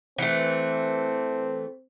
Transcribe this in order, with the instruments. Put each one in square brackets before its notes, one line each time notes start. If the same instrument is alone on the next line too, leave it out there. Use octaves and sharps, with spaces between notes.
[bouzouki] E3 A3 [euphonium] C4